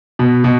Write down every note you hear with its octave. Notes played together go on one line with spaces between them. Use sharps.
B2
B2